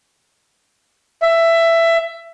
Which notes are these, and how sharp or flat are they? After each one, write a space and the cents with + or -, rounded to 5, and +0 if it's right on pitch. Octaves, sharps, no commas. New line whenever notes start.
E5 +15